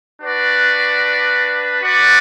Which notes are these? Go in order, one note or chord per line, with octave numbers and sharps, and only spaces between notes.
D4 F#4 B4 D5
F#4 B4 D5